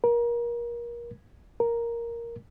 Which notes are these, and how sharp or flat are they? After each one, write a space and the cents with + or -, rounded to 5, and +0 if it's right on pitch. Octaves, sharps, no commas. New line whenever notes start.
A#4 +25
A#4 +0